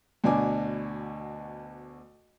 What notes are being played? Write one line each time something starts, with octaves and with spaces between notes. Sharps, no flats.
D2 B2 D4 G#5 D6